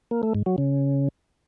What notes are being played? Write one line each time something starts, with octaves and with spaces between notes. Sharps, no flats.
A#3
A3
G#2
F#3
C#3